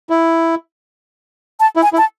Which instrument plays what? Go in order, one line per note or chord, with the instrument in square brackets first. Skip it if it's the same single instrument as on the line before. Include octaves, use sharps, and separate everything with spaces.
[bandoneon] E4
[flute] A5
[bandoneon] E4
[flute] G#5
[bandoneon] E4
[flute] A5